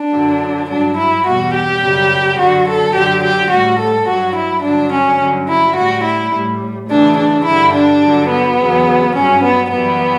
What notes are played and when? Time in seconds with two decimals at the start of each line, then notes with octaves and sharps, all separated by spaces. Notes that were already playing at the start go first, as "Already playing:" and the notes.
Already playing: D4
0.13 F#2 D3 F#3
0.69 G2 F#3 D4
0.97 E4
1.25 E2 B2 G3 F#4
1.54 G4
1.82 F#2 C#3 G3
2.38 F#2 D3 F#3 F#4
2.66 A4
2.94 F#2 D3 F#3 G4
3.23 G4
3.50 A2 G3 F#4
3.79 A4
4.07 G2 F#3 F#4
4.35 E4
4.63 G2 D3 F#3 D4
4.92 C#4
5.20 G2 D3 F#3
5.48 E4
5.76 A2 G3 F#4
6.04 E4
6.32 A2 G3
6.89 D2 C#3 E3 D4
7.17 D4
7.45 G2 D3 G3 E4
7.73 D4
8.02 G2 D3 F#3
8.30 B3
8.58 E2 C#3 F#3
9.14 G2 F#3 C#4
9.43 B3
9.70 F#2 E3 G3 B3